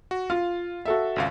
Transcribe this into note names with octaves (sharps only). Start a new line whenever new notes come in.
F#4
F4 F5
F#4 A4 E5
G#1 C#2 F5